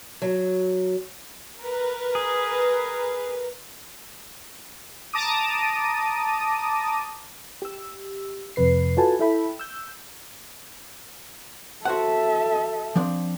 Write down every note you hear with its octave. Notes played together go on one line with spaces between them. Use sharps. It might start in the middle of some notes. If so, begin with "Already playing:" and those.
F#3
A#4 B4
G#4
A5 A#5 D6 D#6 D#7
G4 E6
F2 C3 B4 C7
F4 F#4 A4 B4 G#5 A5
E4 A4 E5 G5 B5
E6 G6
F#4 A4 C5 E5 F#5
F3 C4 D4